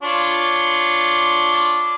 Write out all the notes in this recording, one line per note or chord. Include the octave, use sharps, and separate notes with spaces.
D4 F4 C#5